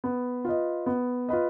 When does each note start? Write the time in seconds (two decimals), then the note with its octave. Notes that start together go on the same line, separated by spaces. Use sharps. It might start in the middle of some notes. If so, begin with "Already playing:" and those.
0.04 B3
0.45 F4 B4 D#5
0.86 B3
1.29 F4 B4 D#5